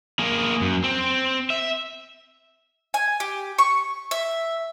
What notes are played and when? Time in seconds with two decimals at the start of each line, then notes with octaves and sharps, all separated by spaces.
0.19 A#3 G#4
0.61 F#2
0.84 C4
1.50 E5
2.94 G#5
3.20 G4
3.58 C#6
4.11 E5